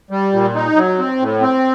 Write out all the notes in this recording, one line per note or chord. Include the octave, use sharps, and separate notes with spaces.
G3
A#2
D#4
F#3
C4
A2
C4